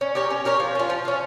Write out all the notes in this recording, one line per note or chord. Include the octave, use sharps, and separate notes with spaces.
C#4
G4 A#4 C#5
C#4
G4 A#4 C#5
F3
C#4 F4
F3
C#4 F4